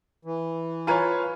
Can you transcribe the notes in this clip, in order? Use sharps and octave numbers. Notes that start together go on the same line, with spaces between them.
E3
F4 B4 C#5 G#5 A#5 G#6